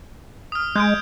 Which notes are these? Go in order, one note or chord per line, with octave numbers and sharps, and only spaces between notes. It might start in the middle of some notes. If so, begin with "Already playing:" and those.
D#6 F6
G#3 G6 G#6 D7